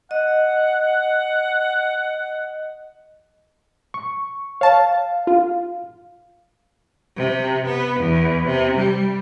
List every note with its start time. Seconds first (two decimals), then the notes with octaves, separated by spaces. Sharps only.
0.11 D#5 F#5
3.94 C#6
4.61 C#5 F5 A5
5.27 F4
7.16 C3
7.66 B3
8.00 E2
8.46 C3
8.77 G3